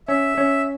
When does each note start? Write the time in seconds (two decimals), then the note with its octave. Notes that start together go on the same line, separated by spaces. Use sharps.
0.08 C#4 E5
0.38 C#4